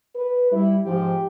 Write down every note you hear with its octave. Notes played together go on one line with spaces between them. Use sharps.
B4
G3 E4
G#2 F3 G4